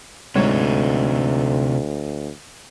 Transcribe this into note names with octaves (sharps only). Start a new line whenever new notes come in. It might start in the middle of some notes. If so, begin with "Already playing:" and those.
D2 G#2 C3 D#4 C#5